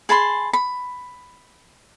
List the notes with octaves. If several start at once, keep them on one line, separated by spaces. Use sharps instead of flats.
G#4 A5 B5 C6
B5